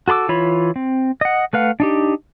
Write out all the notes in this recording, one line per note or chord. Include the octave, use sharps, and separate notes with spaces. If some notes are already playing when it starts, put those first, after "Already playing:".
F#4 A4 B5 D6 E6
E3 F4 C#5 B5
C4
D#5 F#5
A3 B4 F5 F#5
D4 D#4 G4